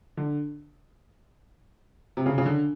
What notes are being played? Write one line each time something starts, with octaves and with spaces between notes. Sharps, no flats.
D3
C3
C#3
C#3
D3